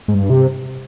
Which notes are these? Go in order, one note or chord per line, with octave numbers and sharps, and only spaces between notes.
G#2
G2
C3